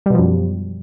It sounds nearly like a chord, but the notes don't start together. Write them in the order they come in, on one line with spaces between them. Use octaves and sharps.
G3 B2 F3 F#2